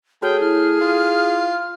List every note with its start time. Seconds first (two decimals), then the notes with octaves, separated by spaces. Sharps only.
0.22 A3 F#4 G#4 C#5 G5 F6
0.41 E4 F6
0.80 F4